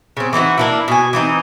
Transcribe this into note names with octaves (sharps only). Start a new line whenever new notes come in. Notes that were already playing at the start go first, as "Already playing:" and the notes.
C#3 C4
E3 C4 D#4 F#4
A#3 D4 E4
B2 G#5
E3 C4 D#4